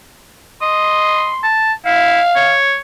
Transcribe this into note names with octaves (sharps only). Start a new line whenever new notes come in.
D#5 C6
A5
E4 F5
C#5